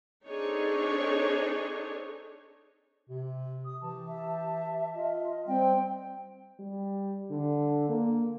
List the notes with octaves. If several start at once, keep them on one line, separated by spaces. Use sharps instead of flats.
C4 D4 D#4 G#4 A4 C#5
C3
D#6
E3 G4 A5
E5
F4 D#5
G3 C4 G5
G3
D3
A#3